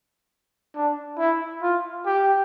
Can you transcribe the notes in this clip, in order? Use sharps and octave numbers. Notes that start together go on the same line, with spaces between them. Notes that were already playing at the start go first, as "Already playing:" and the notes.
D4
E4
F4
G4